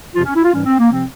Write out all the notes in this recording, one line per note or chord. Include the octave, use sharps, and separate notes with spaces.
F2 C3 F3 F4
C#4
E4
F4
G#2 E3 G3 C#4
C4
A#3
C3 F3 C4